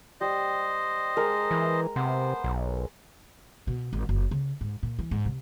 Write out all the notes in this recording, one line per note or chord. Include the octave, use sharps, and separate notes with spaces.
G3 C5 D#5
G#3 A#4 D#6
E3
C3 B3 C5
B1
B2
G#1
F#1
C#3
G#2
A#2
E3
G#2
C3